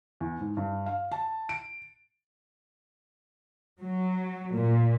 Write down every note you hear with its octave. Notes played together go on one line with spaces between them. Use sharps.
E2
G#2
G2
F5
A5
D7
F#3
A#2